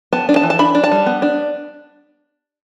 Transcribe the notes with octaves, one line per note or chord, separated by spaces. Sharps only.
B3 A5
D4
A5
E3
A5
D4 B5
D4
A5
G3
B3
D4